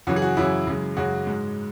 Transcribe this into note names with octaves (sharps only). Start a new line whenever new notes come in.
F#2 C#3 E3 F#4
G#4
F#4
F#2 C#3 E3 E4
F#2 C#3 G#3
F#2 C#3 G#3 F#4
G#2 G#3